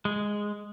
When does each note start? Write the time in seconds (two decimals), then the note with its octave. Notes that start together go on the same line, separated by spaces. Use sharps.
0.05 G#3